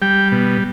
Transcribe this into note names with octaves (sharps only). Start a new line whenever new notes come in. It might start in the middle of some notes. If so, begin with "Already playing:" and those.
G3 G5
B2